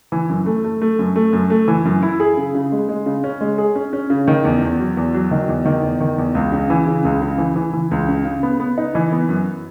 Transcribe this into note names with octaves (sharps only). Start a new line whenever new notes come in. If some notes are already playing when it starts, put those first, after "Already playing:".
E3
F#2
A3
A3
A3
F#2
A3
F#2
A3
E3
F#2
E4
G#4
C#3
C#3
G#3
G#3
C#3
C#4
G#3
G#4
C#4
C#4
C#3
D#3
E2
E2
F#3
E2
F#3
D#3
E2
D#3
E2
D#3
E2
C#2
C#3
E3
C#3
C#2
C#3
E3
E3
E3
C#2
C#3
C#3
B3
B3
D#4
E3
B3
F#2